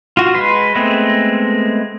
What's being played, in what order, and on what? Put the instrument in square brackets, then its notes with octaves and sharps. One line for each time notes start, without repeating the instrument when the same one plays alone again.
[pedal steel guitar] F4 F#4
G#3 B4 C6
G#3 A3 B3 C4